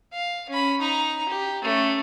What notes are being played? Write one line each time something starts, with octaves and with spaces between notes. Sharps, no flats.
F5
C#4 B5
D#4 A#5
G4
A3 C#4